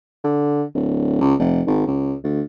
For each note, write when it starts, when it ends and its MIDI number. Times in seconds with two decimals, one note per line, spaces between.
0.24 0.63 50
0.75 1.17 26
1.21 1.35 37
1.40 1.62 29
1.67 1.85 32
1.87 2.14 37
2.24 2.42 38